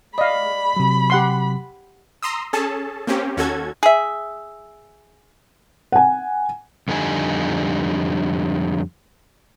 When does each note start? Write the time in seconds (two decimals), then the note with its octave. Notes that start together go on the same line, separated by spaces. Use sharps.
0.18 D5 D#5 F5 B5
0.77 C3 F#3
1.10 G4 F#5 C6
2.23 A#5 C6 D#6 E6
2.53 C#4 G#4 A4 A5
3.07 A#3 C4 C#4 G4
3.37 D#2 C#4 F#4 A4 G#6
3.83 G#4 E5
5.92 F#5 G#5
6.88 F2 D3 G3 D#4 G#5